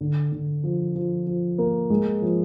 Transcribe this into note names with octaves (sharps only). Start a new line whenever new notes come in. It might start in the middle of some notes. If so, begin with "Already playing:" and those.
D3
D3
F3
F3
F3
A#3
G#3
F3